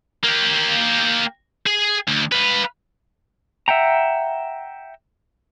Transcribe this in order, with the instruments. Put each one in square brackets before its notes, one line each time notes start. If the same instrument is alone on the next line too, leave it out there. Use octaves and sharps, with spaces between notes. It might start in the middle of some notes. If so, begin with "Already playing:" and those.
[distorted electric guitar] A#3 G4
G#4
D2
B4 F5
[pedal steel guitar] E5 F#5 G5 A#5